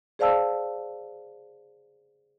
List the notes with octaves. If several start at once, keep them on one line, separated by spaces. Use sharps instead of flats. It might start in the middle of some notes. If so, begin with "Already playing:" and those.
G#4 C5 D5 F5 A5 E6